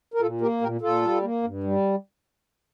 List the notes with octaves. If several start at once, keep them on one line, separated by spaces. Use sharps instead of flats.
A#4
A#2 F4 A4
A#3 G4 A#4
A#2 G4 A#4
A#2 F4 A4
G3
A#3
G2
G3